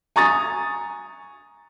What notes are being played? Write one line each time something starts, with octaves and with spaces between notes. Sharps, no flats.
G#5 A#5 C#6 D#6 A6